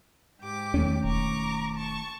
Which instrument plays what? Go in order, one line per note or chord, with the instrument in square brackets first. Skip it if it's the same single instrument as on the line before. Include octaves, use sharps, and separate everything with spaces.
[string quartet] G#2 G4 D6
[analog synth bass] E2 [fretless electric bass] D#3 A3 C#4
[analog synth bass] E1 [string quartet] A#5 C#6 D6
[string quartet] A5 C#6